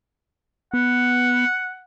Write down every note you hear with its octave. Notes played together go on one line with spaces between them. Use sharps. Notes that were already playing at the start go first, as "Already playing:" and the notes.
B3 F#5